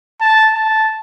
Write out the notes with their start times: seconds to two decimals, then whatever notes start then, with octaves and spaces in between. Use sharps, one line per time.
0.21 A5
0.54 A5